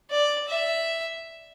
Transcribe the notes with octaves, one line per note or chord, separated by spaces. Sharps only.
D5
E5